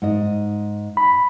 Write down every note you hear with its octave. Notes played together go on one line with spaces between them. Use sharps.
G#2 D#5
B5